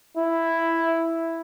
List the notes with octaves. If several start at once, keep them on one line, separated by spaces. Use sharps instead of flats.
E4